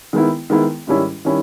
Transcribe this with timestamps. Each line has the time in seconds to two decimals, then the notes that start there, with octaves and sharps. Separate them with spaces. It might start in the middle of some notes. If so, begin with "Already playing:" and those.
0.13 D#3 G#3 B3 E4
0.50 D#3 G#3 B3 E4
0.87 G#2 D#3 G3 C#4 E4
1.25 D#3 G3 C#4 E4